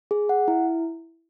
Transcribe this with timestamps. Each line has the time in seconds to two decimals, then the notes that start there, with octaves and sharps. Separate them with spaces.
0.11 G#4
0.29 F#5
0.48 E4